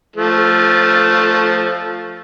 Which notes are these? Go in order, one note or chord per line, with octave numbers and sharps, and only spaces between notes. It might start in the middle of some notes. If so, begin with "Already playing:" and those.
F3 A3